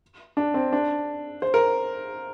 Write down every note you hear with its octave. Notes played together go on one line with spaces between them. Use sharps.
D4
C4
D4
C5
A#4